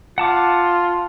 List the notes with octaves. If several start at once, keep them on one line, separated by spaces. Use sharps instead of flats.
F4 F#5 A5 D6